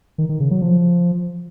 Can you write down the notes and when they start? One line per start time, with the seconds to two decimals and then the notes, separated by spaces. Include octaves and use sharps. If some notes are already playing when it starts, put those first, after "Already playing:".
0.18 D#3
0.29 D#3
0.40 C#3
0.51 F#3
0.62 F3